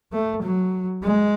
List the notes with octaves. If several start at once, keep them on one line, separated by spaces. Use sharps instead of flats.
A3
F#3
G#3